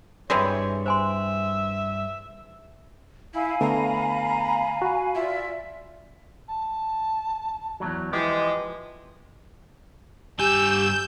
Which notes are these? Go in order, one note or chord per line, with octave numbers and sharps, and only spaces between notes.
G2 C3 E3 G3 G#3 F#4 C#5
C5 E5 G#5 C6
E4 F5 G#5 B5
D3 A3 B3 A#5
F#4
F4 D5 E5
A5
E2 G#2 F#3
E3 F3 G#3 G4
G2 G4 G#5 E6 G6